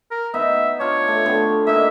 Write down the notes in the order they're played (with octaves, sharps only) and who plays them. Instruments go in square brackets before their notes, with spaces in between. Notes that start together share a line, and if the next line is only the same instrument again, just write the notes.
[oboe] A#4
[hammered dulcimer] B3 D#4 [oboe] E5
[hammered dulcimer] D4 F4 [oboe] C#5
[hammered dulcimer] A3
D3 B3 G5
[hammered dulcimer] A#3 D#4 [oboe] E5